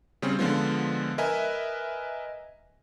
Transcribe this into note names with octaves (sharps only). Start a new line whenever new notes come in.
C#3 G3 C4 C#4
D3 F3 G#3 B3 F4
A#4 B4 D#5 E5 G#5